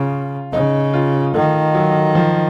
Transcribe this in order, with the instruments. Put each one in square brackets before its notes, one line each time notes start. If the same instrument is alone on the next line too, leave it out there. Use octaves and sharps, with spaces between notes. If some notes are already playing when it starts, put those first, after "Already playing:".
Already playing: [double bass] C#3 [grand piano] F4
[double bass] C#3 [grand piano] D#4
[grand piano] F4
[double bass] D#3 [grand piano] A3
[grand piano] F#3
F3